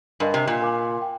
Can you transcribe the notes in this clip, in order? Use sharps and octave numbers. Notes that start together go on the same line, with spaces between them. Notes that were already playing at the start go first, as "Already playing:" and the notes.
G2 A#4 D#5 G#5 C6
C3
A#2
A#4 F5 G#5 D6
G5